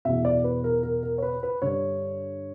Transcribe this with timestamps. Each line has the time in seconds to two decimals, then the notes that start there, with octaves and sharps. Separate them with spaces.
0.05 E2 B2 E5
0.25 D5
0.44 B4
0.64 A#4
0.83 A#4
1.03 A#4
1.18 C#5
1.22 B4
1.43 B4
1.62 G2 D3 C#5